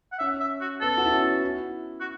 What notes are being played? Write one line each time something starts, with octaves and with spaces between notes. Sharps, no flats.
F#5
C#4 E5
E5
F#4
B3 A4
F#4
E4
C#4
E4
F#4